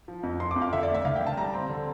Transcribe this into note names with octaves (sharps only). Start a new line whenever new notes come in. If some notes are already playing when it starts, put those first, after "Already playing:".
F3
F2
F3 C6
D6
F2
F5
D3 E5
D5
A3
E5
D2 F5
G5
D2
A5
G3 A#5
C4
D3